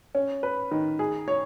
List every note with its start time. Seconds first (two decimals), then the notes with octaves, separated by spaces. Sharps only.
0.15 C#4
0.43 B4
0.71 D#3
0.99 G#4
1.28 C#5